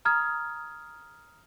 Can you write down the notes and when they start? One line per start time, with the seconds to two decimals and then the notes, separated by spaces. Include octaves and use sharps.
0.05 A#5 D#6 F6 G#6